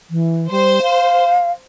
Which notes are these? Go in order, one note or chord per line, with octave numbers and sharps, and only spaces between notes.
E3
G3 C5
F5